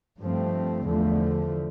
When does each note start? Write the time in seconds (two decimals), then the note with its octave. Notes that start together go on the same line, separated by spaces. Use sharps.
0.19 G2 F3 A3 C4
0.86 E2 D3 F3 A3